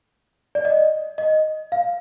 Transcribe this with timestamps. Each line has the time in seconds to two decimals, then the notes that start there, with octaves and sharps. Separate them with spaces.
0.55 D5
0.65 D#5
1.18 D#5
1.72 F5